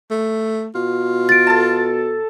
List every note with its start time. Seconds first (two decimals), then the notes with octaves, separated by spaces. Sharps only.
0.11 A3
0.75 B2 F4
1.29 A6 D7
1.47 A4 A5